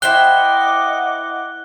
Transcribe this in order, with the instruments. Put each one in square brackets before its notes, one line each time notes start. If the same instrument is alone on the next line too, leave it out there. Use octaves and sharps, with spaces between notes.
[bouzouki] E4 C5 G5 [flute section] D#5 F#5 D6 [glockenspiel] F#6 G7